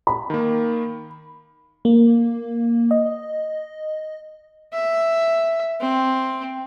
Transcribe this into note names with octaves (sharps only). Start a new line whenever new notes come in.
B5
D#3 A#3
A#3
D#5
E5
C4